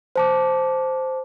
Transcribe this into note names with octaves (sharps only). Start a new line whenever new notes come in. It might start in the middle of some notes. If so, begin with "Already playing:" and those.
C5 A5 D6